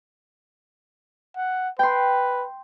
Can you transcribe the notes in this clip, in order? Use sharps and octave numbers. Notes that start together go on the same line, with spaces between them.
F#5
B4 G5 C6